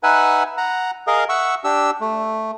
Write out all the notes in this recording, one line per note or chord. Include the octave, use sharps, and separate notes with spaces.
D#4 B4 E5 F#5 G#5
F#5 A#5
G#4 A#4 D#5 F5
E5 F#5 C#6 E6
D4 G4 E6
A3